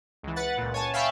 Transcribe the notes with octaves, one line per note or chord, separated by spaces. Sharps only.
C#2 E3
B4 F#5 A6
C#2 A#2
C#5 G#5 A5
E5 F5 G5 B5 C#6 A6